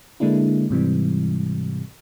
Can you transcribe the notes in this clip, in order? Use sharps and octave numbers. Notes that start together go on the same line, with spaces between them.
D3 G#3 A#3 D4 E4
G#2 C3 E3 G3